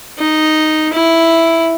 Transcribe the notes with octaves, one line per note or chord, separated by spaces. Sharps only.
D#4
E4